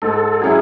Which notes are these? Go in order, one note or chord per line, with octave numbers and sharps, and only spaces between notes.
G#2 A4
F#3 C#4 E4 G#4